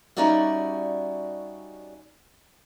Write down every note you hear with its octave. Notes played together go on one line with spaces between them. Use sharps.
G3 C#4 D#4 F#4 D5 E5